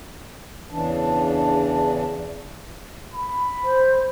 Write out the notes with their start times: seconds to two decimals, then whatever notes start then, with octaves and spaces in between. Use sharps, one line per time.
0.71 E2 C#3 E3 D4
3.14 B5
3.63 C5